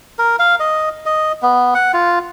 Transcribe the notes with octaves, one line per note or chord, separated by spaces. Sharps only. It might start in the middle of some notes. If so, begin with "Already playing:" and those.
A#4
F5
D#5
D#5
B3
F#5
F4